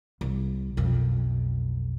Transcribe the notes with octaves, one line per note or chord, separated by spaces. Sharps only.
C2
B1 F2